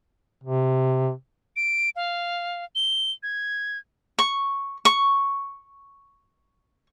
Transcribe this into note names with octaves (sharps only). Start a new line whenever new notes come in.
C3
D7
F5
G7
G#6
C#6
C#6